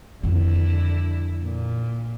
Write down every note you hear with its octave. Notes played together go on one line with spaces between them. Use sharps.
F2 D3 D#3 E4
A#2